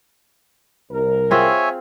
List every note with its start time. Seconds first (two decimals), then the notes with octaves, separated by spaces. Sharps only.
0.91 C2 A#4
1.31 C4 F4 G#4 C#5 E5 G#5